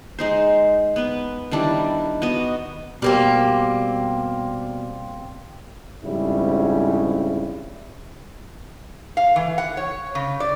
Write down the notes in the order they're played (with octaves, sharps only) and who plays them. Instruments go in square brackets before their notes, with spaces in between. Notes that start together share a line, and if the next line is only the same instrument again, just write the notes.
[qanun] G#3 D#4 C5
B3 B4
D#3 G3 D4 E4
B3 F#4 D#5
[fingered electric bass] B2 [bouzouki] G3 A#3 C4
[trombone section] F2 G#2 C#3 G3 E4
[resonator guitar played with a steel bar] F5
E3
F#5
C#5
C#3
D5